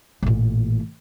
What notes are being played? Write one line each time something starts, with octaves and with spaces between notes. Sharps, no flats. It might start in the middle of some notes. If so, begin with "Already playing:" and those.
A1 A#2